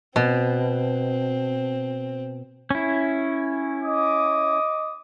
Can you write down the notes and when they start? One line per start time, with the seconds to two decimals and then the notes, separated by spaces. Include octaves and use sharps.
0.16 B2 C4
2.71 C#4 E4
3.84 D#5 D6 D#6